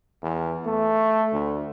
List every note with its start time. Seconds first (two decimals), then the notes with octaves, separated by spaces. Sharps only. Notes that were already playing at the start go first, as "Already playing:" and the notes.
0.22 E2
0.65 A3
1.33 D2